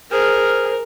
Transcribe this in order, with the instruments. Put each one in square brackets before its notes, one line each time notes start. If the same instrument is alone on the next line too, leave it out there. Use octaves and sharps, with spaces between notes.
[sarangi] G#4 [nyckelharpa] A#4 [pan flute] C5 [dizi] F6